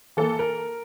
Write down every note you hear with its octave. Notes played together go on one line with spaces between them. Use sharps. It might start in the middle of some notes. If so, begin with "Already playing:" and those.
E3 A#3 A4
A#4